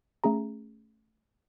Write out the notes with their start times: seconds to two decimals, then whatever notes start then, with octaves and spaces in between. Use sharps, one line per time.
0.24 A3 C#4 G#4 A#5